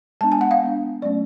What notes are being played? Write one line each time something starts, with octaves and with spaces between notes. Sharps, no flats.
G#3 B3 D4 A5
G#5
F#5
F5
G#3 B3 D4
F#3 A3 C#4 D5